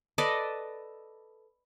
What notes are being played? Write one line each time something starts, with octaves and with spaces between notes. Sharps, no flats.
A4 B4 D5 D#5